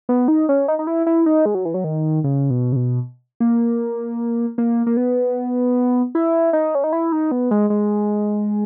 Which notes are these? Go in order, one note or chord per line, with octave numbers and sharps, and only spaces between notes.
B3
D#4
C#4
D#4
D#4
E4
E4
D#4
G#3
F#3
E3
F#3
D#3
C#3
B2
C#3
B2
A#3
A#3
A#3
B3
E4
D#4
C#4
D#4
E4
D#4
B3
G#3
G#3